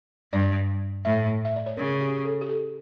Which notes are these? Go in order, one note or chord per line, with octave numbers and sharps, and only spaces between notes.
G2 D5
A2 E5
E5
D5
C#5
C#3 A#4
G4
A4
G4
A4